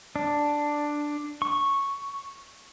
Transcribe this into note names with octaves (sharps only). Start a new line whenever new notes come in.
D4
C#6